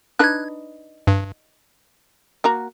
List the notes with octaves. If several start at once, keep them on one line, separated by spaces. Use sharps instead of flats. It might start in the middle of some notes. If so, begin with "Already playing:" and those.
D4 D#4 B4 F#6 G#6
G2
A#3 F#4 A#5